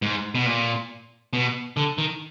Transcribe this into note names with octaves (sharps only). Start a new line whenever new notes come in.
G#2
B2
A#2
B2
D3
D#3